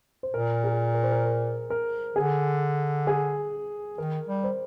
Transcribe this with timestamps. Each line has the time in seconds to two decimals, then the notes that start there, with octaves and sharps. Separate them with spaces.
0.23 C5
0.34 A#2 A#4
0.64 G#4
0.94 A#4
1.04 C5
1.12 A#4
1.25 A#4
1.70 A#4
2.16 D3 G#4
3.07 G#4
3.98 D#3 A#4
4.28 G3
4.44 C5